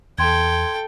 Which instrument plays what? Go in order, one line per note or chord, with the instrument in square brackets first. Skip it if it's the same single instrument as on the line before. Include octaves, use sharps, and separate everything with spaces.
[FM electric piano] E2 [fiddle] A4 G5 [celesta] C6 G#6